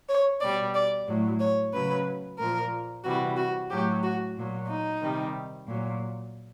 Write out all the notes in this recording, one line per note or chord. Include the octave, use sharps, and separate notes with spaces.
C#5
B2 G3 D5
D5
A2 F#3
C#5
C#3 F#3 B4
A#2 F3 A#4
C3 E3 G3 F#4
F#4
A2 F#3 G4
F#4
A#2 F#3
D#4
C3 D#3 G3
A#2 F#3